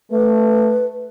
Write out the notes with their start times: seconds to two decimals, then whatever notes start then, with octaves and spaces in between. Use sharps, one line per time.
0.11 A3 B4